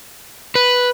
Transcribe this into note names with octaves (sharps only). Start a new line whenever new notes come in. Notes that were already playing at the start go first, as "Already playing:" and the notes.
B4